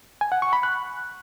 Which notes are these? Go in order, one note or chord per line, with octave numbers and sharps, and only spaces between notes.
G#5
F#5
C#6
B5
F#6